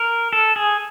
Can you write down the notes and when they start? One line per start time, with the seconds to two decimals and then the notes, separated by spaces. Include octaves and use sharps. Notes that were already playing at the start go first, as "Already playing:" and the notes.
Already playing: A#4
0.33 A4
0.56 G#4